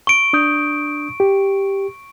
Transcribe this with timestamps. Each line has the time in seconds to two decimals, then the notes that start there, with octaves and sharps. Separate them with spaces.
0.07 C#6 D7
0.33 D4 D#6 G6
1.20 G4